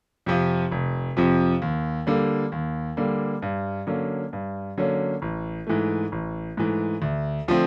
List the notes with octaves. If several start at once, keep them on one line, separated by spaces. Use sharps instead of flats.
F2 C3 F3
F1
F2 C3 F3
D#2
D3 G3 A#3
D#2
D3 G3 A#3
G2
D3 F#3 A#3 C#4
G2
D3 F#3 A#3 C#4
A1
G#2 E3 A3
A1
G#2 E3 A3
D2
D3 F3 A3 C4